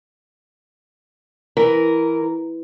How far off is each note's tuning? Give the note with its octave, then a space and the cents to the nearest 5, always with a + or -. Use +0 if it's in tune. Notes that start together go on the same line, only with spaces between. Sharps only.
E3 +0 A#4 +0